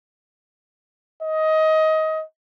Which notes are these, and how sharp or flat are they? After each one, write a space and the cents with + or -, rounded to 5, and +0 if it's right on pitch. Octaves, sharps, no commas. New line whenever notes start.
D#5 +20